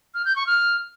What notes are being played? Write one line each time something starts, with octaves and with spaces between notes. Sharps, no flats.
F6
G6
C#6
F6